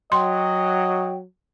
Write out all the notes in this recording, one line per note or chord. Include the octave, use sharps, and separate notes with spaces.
F#3 D#5 G5 C6